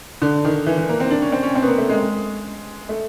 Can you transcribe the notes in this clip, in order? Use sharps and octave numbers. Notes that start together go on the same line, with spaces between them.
D3
D#3
E3
E3
A#3
C4
D4
C#4
C4
C#4
C4
B3
A#3
A3
G#3
A3